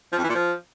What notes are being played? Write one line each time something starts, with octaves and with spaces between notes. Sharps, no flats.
F3
F2
E3
A#2
F3